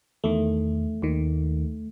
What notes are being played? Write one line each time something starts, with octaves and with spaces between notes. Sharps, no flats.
E2 D#3 A3
D#2 D#3